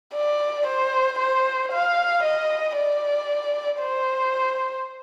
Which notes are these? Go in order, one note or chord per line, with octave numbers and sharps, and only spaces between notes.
D5
C5
C5
F5
D#5
D5
C5